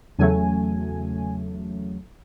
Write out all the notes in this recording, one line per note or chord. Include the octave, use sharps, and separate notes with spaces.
E2 C#3 F#3 A3 G#5